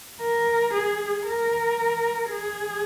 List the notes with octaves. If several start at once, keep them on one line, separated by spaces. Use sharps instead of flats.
A#4
G#4
A#4
G#4